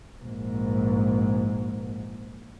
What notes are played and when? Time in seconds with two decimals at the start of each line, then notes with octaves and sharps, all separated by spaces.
0.22 A#1 G#2